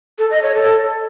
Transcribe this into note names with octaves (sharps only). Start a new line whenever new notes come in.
A4
D#5
C#5
A4